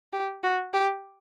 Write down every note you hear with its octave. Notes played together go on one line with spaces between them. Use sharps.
G4
F#4
G4